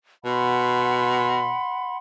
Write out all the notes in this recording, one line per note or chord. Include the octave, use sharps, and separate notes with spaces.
B2 F#5 B5 C6